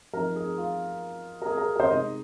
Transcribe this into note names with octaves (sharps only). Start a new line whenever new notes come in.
F3 C4 D#4 A#4
G#4
F4
A#4
G#4
A#4
A#4
C5
C3 G#3 D#4 D#5